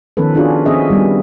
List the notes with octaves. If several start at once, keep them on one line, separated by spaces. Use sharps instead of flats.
D#3 F3 B3 C#4 A4 B4
C#4 D4 F4 F#4 G#4
C4 C#4 G#4 D#5 E5
G3 B3